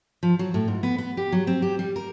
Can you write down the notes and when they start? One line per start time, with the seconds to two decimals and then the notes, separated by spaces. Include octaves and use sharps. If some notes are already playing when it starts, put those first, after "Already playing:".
0.23 F3
0.39 F#3
0.54 A2
0.68 G#2
0.83 B3
0.98 B3
1.17 G4
1.32 F#3
1.47 C4
1.62 G4
1.79 G3
1.96 A#4